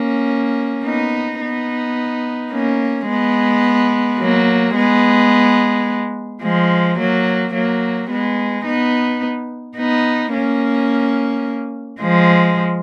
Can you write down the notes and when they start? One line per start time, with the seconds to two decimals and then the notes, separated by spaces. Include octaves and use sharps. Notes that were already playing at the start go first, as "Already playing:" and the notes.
Already playing: A#3 C#4
0.85 B3 D#4
1.40 B3 D#4
2.52 A#3 C#4
3.08 G#3 B3
4.19 F#3 A#3
4.76 G#3 B3
6.42 F3 G#3
6.98 F#3 A#3
7.54 F#3 A#3
8.10 G#3 B3
8.65 B3 D#4
9.77 B3 D#4
10.33 A#3 C#4
12.00 F3 G#3